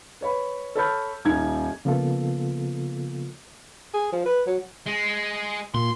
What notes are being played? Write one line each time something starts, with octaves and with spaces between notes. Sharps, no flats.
B4 C#5 B5
A4 C#5 A5 B5 F6 G6
D#1 D#4 G#6
C#3 F3 A#3 B3 F4 A4
G#4
F3
B4
F#3
G#3
A#2 C6